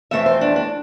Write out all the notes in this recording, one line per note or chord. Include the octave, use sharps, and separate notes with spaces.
F2 E3 A3 C4 E5
C5
D4
D4